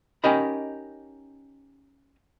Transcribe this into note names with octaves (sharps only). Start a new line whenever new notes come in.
C#4 D#4 G4 A#4 D#5 B5